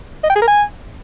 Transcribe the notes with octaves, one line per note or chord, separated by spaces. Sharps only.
D#5
G5
G#4
A#4
G#5